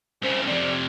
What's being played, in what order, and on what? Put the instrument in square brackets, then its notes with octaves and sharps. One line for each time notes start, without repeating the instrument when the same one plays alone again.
[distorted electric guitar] C2 C#3 [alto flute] C5
[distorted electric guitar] F2 C3 [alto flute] D5